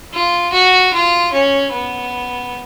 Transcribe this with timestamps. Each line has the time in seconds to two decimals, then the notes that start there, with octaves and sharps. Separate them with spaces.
0.14 F4
0.53 F#4
0.94 F4
1.33 C#4
1.72 B3